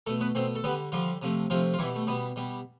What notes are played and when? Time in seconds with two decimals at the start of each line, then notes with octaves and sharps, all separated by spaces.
0.07 B2 A3 A4
0.21 B3 B4
0.35 B2 A3 C4 C5
0.56 A4
0.64 D3 G3 B3 B4
0.92 D3 F3 G3 F4
1.22 C3 F3 A3
1.50 C3 F3 A3 F4
1.74 F4
1.79 E3 G3 E4
1.83 B2
1.96 A3
2.07 B2 G3 B3
2.36 B2 G3